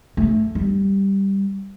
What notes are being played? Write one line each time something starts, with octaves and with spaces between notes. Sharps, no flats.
A3
G3